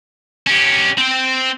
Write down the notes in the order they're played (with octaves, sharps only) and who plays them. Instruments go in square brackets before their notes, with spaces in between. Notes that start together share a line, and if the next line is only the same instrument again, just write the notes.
[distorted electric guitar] C#4 G4
C4 G5